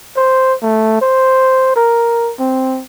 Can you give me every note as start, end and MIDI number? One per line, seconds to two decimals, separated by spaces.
0.16 0.55 72
0.62 1.01 57
1.01 1.73 72
1.76 2.32 70
2.39 2.82 60